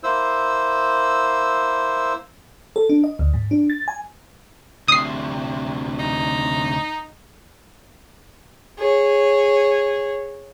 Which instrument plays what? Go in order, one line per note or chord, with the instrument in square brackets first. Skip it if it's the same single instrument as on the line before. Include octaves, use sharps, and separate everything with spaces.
[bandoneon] A#3 E4 C5 E6
[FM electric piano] A4
D4
D#5
D2
G#2
D4
A6
G#5
[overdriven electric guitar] D2 C3 [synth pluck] D#6 C7
[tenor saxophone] D#4
[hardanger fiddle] G#4 C#5